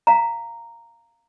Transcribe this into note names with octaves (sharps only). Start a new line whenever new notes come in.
F5 A#5